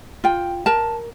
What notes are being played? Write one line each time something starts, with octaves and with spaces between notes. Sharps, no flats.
F4 G5
A#4 A5